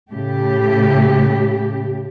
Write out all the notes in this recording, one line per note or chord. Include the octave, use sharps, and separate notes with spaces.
A2 C#3 A3 G4